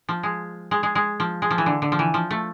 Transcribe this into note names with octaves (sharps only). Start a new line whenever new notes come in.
F3
G#3
G#3
G#3
G#3
F3
G#3
F3
E3
D3
D3
F3
E3
F3
A3